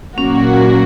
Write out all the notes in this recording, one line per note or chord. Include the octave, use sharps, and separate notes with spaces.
A#2 F#3 A#3 C#4 F#4